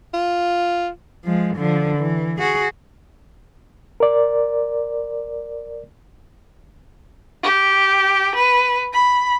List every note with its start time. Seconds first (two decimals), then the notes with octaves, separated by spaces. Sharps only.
0.14 F4
1.24 F3 G#3
1.56 D3 F3
1.97 E3
2.39 F#4 G#4
4.00 A#4 D5
7.43 G4
8.35 B4
8.93 B5